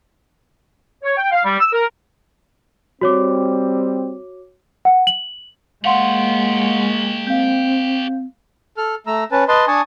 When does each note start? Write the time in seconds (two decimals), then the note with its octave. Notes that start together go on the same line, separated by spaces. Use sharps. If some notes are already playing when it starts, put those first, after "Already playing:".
1.03 C#5
1.17 G5
1.31 F5
1.45 G3
1.60 E6
1.73 A#4
3.01 G3 C4 F#4 C#5 D6
4.85 F#5
5.07 F#7
5.85 G#3 A#3 G4 C#5 F5 F#5 C6
7.27 C4 F5 G6
8.77 A4 F6
9.07 A3 A#5 E6
9.32 C#4 B4 A5
9.48 B4 D#5 A5 C6
9.68 D4 G#5 A5 C#6 D#6